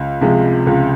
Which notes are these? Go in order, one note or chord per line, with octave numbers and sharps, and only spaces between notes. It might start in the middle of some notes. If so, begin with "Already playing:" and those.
Already playing: C#2
C3 F3 G#3
C#2